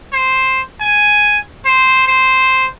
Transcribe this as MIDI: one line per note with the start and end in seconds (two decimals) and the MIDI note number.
0.13 0.61 72
0.81 1.38 80
1.66 2.04 72
2.08 2.66 72